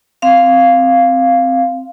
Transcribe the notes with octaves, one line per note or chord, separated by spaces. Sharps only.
C4 F5